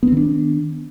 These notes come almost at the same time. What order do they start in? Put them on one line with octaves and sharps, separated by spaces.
B3 C4 D#3 D4